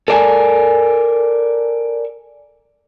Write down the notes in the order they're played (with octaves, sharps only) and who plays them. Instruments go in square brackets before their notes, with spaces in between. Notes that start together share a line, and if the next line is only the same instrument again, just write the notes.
[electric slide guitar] A4 A#4 D5 G#5